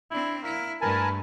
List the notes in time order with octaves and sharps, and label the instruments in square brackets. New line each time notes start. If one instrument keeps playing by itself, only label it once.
[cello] C4 D4 [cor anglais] E4
[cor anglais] A#3 [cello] E4
[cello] G2 A3 [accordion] A#4 G#5 A5 [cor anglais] B4